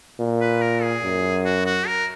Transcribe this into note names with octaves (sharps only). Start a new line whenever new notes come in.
A#2
B4
A#4
G#4
F#2
F#4
F#4
A#4